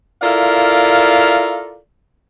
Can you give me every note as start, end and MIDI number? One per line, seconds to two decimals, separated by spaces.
0.22 1.77 64
0.22 1.77 65
0.22 1.77 69
0.22 1.77 70
0.22 1.77 74
0.22 1.77 77